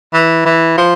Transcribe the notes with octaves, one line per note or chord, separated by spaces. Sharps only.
E3
E3
F3